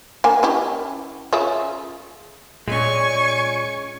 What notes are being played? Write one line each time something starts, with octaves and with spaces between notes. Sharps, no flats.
A#3 G#5
C#4 E4 G4
C#3 F4 E5
A#2 G#3 C#4 G#5 C#6